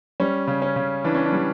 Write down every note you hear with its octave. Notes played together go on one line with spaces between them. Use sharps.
G3 C#4
C#3
C#4
C#3
E3 D4
C#4
D4
G3